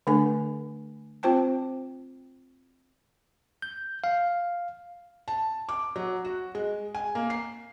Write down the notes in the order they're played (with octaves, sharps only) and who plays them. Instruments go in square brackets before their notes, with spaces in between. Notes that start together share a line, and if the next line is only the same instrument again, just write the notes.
[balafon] D3 A3 D4 A4 G#5
C4 F4 C5 G5 A5
[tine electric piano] G6
F5
[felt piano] A5
D6
F#3
F#4
G#3
G#5
A#3
C7